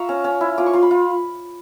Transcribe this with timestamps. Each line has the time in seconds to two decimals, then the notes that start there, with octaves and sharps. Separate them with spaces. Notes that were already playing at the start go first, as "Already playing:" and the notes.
Already playing: F4 E5 A#5 C#6
0.09 C#4
0.24 C#4
0.41 E4
0.58 F4 D6
0.66 C#6
0.73 F4 C6
0.83 B5
0.91 F4